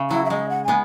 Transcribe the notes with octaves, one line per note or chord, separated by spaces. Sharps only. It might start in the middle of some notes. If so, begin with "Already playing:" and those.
Already playing: C#3
F#3 E4
E5
G#3 D#5
F#5
G#3 B3 G#5